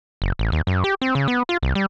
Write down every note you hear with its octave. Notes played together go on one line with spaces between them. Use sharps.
F#1
A1
D#2
F#2
G4
C4
C#3
B3
F4
C2
G3